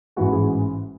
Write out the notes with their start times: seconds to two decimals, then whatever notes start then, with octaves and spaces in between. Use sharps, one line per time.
0.16 A1 G#2 E3 G#3 F#4
0.32 G#4